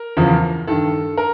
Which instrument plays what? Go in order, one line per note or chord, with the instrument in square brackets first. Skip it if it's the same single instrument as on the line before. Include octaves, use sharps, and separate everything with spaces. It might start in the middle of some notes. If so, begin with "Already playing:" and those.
Already playing: [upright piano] A#4
E2 C#3 F3
G2 D#3 A4
A#4